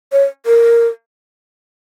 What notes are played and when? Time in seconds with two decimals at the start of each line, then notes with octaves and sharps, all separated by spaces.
0.12 C#5
0.46 A#4